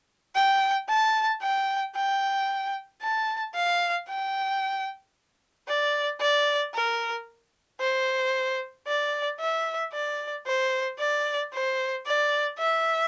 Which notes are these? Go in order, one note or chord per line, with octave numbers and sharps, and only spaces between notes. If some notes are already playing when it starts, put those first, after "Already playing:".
G5
A5
G5
G5
A5
F5
G5
D5
D5
A#4
C5
D5
E5
D5
C5
D5
C5
D5
E5